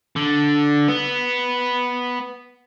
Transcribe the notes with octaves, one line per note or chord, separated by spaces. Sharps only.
D3
B3